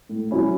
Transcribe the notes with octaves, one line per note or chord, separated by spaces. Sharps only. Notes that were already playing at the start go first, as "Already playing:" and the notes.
A2
F#3 C#4 E4